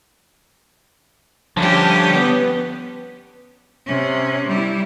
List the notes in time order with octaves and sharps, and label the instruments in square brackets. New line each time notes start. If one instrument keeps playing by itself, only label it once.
[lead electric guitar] G2 D3 [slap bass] F3 [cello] C#4 G4
[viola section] B3
[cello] C3 C#4
G3 E4